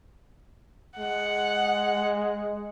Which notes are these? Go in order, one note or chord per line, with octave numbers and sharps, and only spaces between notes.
G#3 F#5